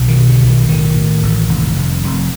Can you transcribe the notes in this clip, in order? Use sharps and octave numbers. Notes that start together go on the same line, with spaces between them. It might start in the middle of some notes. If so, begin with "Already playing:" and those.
Already playing: B1 C3
D#3
B2
D3
B1
D#3
A2 D#3
A2
A1
F1
F1
F1